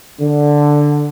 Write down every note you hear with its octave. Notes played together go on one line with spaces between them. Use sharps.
D3